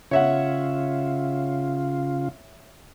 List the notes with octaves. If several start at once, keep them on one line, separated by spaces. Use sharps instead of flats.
C#3 F4 C#5 E5 F#5